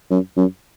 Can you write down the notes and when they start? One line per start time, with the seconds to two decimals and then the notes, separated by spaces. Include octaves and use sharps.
0.10 F#2
0.37 F#2